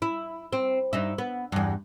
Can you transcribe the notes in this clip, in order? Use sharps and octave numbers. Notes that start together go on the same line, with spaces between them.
E4
C4
G2 D#4 E4
B3
E2 G2